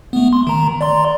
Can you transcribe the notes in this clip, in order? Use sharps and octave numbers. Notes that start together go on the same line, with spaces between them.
A3 B3
C6
D#3 A#5
D5 A#5 C6